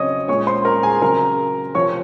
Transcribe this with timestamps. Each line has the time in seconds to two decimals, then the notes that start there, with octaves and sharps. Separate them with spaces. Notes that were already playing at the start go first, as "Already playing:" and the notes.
Already playing: C#3 F#3 C4 C#5 D#5 D#6
0.28 A#2 G#3 C#4 C#5 C#6
0.47 C5 C6
0.65 A#4 A#5
0.83 G#4 G#5
1.01 C#3 F#3 C4 A#4 A#5
1.75 C3 F3 C4 C#5 C#6